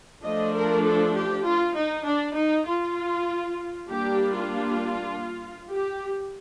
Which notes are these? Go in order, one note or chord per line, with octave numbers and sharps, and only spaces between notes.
F3 A3 D4 D#5
A#4
A4
G4
F4
D#4
D4
D#4
F4
G3 A#3 D4 G4
F4
G4